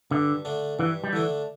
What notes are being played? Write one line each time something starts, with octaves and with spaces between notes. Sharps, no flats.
G2 D3
D3 A3 D4
G2 E3
G3
D3 E3 A3 D4